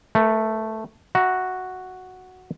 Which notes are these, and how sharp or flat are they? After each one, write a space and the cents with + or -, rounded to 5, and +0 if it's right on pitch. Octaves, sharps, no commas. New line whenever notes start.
A3 +0 A#4 +45
F#4 +0 E5 +0 A#5 +20